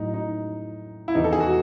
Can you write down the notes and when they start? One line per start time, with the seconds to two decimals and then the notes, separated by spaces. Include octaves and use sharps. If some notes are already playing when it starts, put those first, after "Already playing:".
Already playing: A2 F#3 D#4
0.14 D#4
1.08 E4
1.15 E2 C3 D#3 D#4
1.24 A4
1.32 G#4
1.40 F#4